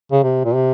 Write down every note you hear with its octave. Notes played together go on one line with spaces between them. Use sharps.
C#3
C3
A#2
C3